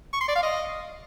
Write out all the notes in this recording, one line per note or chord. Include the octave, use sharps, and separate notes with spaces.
C#6
C6
D5
F5
D#5